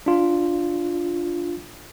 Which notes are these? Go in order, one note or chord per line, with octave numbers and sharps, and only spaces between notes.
D4 F4